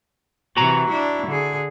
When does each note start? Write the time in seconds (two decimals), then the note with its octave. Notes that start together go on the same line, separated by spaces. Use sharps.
0.57 C3 E3 F#4 A#5
0.90 D4 E4
1.27 D3 G#4